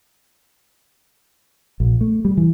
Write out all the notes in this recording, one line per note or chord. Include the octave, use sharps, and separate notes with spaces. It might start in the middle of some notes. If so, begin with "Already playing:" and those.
A#1
A3
G3
E3